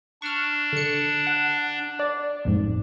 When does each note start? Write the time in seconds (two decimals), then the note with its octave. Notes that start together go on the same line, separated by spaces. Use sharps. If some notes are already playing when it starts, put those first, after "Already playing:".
0.22 D4 C#6 F6
0.73 D3 C#7
1.27 F#5
1.99 D5
2.45 A1 F2 G#2